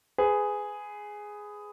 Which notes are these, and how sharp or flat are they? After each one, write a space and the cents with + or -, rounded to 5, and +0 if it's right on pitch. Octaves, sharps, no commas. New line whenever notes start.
G#4 +0 B4 +25